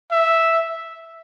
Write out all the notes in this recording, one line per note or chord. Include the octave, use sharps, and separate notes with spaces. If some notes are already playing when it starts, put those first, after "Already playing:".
E5